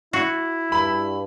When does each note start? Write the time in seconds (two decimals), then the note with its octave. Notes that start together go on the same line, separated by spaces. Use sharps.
0.13 E4 F#4
0.72 G2 B5